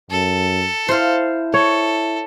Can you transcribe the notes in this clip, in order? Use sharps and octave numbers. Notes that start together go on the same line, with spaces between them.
F#2 A4
E4 C5 F5
A4 C#5